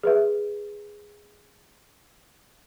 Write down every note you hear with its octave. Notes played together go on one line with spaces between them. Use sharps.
G#4 B4 E5